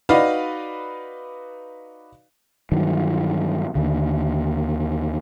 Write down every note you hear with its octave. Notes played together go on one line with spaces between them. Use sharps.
D#4 F#4 B4 D5 D#5 F5
G2 D#3 E3 F#3
D#2 D3